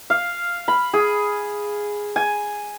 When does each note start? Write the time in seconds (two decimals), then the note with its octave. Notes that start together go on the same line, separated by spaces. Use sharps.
0.10 F5
0.68 B5
0.93 G#4
2.16 G#5